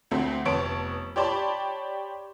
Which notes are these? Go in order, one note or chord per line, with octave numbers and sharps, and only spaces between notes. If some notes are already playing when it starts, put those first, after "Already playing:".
D2 A3 C4
F1 B3 C#5 A5 D7
G4 C#5 D5 A5 B5 C6